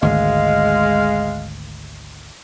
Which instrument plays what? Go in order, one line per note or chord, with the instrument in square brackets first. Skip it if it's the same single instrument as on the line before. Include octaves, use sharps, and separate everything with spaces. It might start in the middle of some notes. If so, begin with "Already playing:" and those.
[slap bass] G#1 D2 [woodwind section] G#3 F5